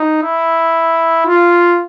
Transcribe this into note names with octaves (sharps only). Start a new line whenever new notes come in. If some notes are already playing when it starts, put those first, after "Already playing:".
Already playing: D#4
E4
F4